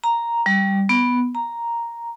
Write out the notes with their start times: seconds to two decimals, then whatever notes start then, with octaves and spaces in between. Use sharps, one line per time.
0.04 A#5
0.46 G3
0.89 B3
1.35 A#5